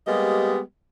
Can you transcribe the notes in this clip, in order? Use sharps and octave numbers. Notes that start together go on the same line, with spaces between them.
G3 G#3 A#3 B3 G4 D#5